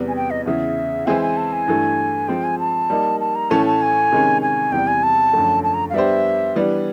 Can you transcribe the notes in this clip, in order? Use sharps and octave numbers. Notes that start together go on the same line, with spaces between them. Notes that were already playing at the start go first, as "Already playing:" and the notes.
Already playing: E2 C3 E3 G3 B3
G#5
G5
D#5
E2 C#3 E3 E5
E3 G#3 C4 E4 G#5
G#5
A5
G#5
G2 E3 A3
F3 G#3 C4 F4 G5
G#5
A5
G3 A#3 D#4
A5
A#5
A2 E3 A3 C#4 A5
A5
G#5
C3 D#3 G#3 C#4
G#5
E2 C3 E3 G3 G5
G#5
A5
F#2 D3 F3 A3
A5
A#5
F5
G3 B3 D4 G4 C5 E5
E3 G3 B3 D4